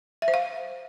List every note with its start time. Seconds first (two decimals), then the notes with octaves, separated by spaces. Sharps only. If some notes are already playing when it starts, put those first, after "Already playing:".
0.22 E5
0.28 C5
0.34 F5